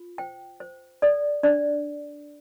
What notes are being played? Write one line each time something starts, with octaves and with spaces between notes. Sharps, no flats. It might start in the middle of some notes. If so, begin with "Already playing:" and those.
Already playing: F4
C5 G5
C5
A4 D5
D4 D5